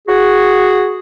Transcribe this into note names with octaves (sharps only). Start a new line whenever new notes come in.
F#4 G#4